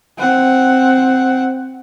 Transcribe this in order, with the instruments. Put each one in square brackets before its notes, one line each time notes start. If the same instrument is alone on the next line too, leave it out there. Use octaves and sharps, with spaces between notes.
[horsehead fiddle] C4 F#5